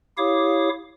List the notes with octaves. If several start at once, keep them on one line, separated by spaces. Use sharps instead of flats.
E4 G4 C#5 F5 D6 D#6